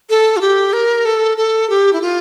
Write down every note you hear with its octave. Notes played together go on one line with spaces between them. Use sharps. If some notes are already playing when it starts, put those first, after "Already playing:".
A4
F4
G4
A#4
A4
A4
G4
E4
F4